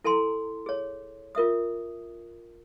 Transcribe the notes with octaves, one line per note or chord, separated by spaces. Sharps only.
E4 A4 G#5 A#5 C6
G#4 C#5
F4 A#4 E5 D#6